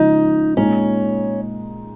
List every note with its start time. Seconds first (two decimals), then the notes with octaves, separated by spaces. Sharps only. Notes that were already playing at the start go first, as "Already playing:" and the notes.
Already playing: C#3 F3 G#3 D#4
0.57 A#2 G#3 C#4 D#4